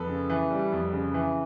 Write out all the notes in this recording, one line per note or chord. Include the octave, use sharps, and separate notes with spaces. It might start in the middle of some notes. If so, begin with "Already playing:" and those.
Already playing: F2 A4 B4
C#3
E3
G3
F2
C#3
E3